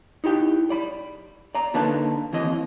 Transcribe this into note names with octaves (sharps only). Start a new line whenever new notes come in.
D#4 E4 G4 G5
D5 B5
D5 A#5
D3 A#3 D4 D#4 B4 A5
D#2 E3 C4 D#5